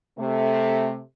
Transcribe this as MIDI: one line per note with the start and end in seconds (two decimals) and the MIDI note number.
0.17 0.99 48
0.17 0.99 57